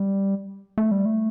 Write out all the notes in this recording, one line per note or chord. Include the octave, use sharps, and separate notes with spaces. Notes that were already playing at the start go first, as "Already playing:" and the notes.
Already playing: G3
A3
G3
A3